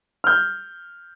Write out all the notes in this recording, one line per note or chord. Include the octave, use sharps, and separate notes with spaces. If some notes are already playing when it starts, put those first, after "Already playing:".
F6 G6